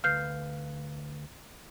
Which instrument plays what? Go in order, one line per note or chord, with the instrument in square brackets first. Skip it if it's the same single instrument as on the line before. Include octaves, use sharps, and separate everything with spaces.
[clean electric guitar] D2 B4 F5 [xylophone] F6 G6 C7